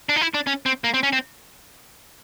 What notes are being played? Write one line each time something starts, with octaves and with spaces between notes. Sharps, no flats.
D4
D#4
E4
D4
C#4
C4
A#3
C4
C#4
C4